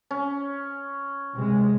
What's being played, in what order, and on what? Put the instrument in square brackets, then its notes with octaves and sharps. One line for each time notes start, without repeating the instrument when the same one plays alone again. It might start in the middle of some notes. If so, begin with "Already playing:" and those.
[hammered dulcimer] C#4
[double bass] C3 G#3